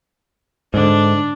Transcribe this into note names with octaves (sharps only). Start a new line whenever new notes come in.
G#2 D3 D4